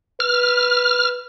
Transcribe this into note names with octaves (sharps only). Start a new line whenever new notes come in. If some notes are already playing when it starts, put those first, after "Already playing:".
B4 F6